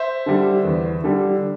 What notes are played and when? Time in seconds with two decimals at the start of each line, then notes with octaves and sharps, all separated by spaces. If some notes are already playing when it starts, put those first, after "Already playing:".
Already playing: C5 E5
0.26 D3 G3
0.64 E2
1.04 D3 G3